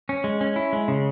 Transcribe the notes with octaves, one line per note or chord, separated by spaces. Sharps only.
C#4
G#3
C#4
E4
G#3
C#3